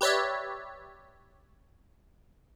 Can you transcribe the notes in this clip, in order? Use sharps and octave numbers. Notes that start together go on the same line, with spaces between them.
G4 B4 C#5 D5 E5